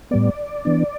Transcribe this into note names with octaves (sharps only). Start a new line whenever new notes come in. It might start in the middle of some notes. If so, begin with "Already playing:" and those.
A2 G3 B3 D5
E3 B3 D4